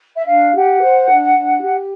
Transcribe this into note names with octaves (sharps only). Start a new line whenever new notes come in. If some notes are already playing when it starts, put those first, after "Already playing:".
E5
D4 F5
G4 F#5
C5
D4
D4
G4